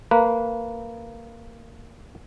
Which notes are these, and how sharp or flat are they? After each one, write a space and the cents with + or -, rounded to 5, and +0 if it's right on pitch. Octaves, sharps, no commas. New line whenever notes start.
A#3 -15 B4 -20